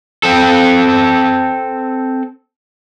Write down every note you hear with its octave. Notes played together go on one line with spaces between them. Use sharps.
C4 A4